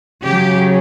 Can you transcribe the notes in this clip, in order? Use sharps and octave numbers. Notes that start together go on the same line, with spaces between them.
C#3 F#3 G4